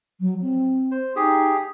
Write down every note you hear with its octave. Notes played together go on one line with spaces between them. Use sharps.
F#3
C4
C5
D#4 G4 G#4